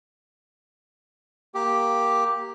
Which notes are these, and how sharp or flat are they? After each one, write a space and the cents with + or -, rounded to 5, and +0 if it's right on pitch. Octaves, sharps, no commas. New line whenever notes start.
A#3 +0 G4 +0